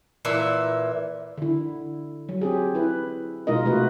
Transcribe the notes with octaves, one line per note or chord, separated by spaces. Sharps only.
A#2 E3 E5
D3 E4
F#3
C4 G4 G#4
E4 B4
B2 G#3 D#4 F4 A#4 D#5
C3 A3 F4 F#4 B4